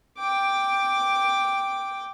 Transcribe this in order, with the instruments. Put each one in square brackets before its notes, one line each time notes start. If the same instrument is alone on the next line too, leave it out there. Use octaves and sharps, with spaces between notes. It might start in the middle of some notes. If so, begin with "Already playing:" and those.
[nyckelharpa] G5 D6